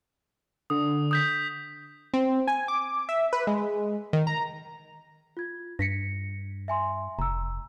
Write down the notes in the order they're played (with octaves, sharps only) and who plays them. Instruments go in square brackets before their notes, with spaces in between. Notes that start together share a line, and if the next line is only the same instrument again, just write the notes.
[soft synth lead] D3 [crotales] D#6
[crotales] D#6 G6 B6
[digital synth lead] C4
G#5
D6
E5
B4
G#3
D#3
A#5
[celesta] F4 G#6
[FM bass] G2 [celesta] A#6 B6 C#7
[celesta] E5 G#5 C6
[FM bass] F1 [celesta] A#5 E6